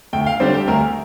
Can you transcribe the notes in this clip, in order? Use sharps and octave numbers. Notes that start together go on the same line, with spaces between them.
D2 G5
F5
D3 G3 C4 C5
G4
D2 A#4